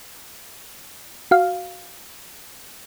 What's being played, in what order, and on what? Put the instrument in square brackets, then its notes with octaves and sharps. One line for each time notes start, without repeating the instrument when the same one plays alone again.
[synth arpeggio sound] F#4 F5